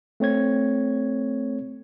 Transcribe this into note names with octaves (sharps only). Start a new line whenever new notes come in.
A3 C4 C#5 G#6